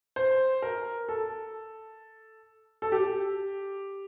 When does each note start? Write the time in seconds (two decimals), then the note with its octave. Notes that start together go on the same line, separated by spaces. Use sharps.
0.16 C5
0.62 A#4
1.09 A4
2.82 A4
2.92 G4